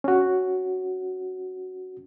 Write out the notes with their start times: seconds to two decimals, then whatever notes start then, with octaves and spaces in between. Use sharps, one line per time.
0.04 C#4 F#4